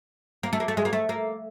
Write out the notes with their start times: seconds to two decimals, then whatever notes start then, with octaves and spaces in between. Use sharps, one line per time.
0.43 A#3
0.53 A3
0.60 A#3
0.68 A3
0.77 G#3
0.85 A#3
0.93 A3
1.09 A#3